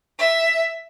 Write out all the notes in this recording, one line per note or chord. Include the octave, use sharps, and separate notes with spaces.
E5